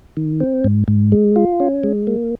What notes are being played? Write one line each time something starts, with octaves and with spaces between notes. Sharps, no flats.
D#3
C4
G#2
G#2
G#3
F4
C#4
G#3
A#3